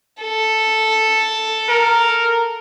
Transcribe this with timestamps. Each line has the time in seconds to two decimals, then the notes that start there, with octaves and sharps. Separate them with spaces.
0.21 A4
1.69 A#4